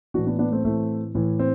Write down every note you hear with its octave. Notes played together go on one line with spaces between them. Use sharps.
A2 E3 D4 F#4
B3 D4
B3 D4
A3 C4
A2 E3 A3 C4
A2 E3
C4